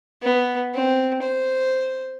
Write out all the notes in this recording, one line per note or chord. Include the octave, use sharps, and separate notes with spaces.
B3
C4
C5